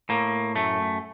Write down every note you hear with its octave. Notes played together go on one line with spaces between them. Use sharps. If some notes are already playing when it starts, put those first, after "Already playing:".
A2 A#3
F#2 A3